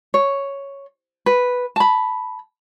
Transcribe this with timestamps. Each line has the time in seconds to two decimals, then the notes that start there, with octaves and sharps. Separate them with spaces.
0.14 C#5
1.26 B4
1.76 A5 B5